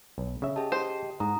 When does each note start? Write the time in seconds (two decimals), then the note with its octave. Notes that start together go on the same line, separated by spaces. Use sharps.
0.18 B1
0.42 C#3 E5
0.56 G4 G#4 D#5 A5
0.72 C5
1.20 G#2 A#5 D#6